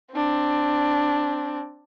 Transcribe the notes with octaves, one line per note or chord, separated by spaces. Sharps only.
C4 D4